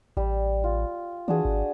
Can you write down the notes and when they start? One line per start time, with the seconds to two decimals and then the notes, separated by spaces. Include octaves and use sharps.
0.17 A1 G3
0.64 F4
1.28 E3 D4 F#4 G#4
1.45 G#1